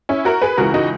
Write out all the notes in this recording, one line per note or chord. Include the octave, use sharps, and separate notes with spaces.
C#4 E4
F#4 A#4
G#4 B4
C#2 C#3 E3 F#4 A#4
D#4 F#4